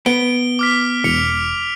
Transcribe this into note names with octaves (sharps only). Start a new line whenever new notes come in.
B3 D7 G7
D6 F6 B6
E1 C#7 F7